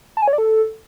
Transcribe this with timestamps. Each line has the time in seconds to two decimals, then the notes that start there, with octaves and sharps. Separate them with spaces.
0.17 A5
0.22 G#5
0.28 C#5
0.33 D5
0.38 A4